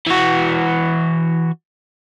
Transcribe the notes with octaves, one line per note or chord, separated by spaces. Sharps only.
E3 F#4